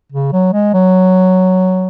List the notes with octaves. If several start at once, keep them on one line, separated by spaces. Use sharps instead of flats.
C#3
F#3
G#3
F#3